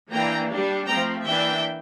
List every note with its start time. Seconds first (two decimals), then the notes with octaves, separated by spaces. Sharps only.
0.11 E3 A#3 D4 G5 A#5
0.49 G3 D4
0.86 F3 A3 C4 G5 A#5
1.25 E3 A#3 D4 E5 G5